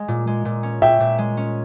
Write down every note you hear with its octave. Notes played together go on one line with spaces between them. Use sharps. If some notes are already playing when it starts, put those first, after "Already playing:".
Already playing: G#3
A#2
G#3
A#2
C#4
A#2 E5 G5
A#2
G#3
C#4